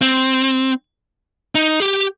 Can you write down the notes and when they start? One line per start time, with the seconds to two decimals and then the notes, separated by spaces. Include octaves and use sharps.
0.01 C4
1.55 D#4
1.80 G4